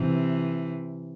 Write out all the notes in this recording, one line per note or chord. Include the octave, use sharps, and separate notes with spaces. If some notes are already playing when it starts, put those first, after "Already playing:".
Already playing: C3 E3